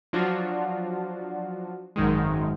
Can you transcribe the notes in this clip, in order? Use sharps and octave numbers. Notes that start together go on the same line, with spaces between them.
F3 F#3 D4 F4 F#4
G#1 F#2 D#3 G#3